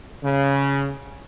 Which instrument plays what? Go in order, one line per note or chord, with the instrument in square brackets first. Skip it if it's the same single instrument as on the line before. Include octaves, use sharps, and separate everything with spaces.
[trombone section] C#3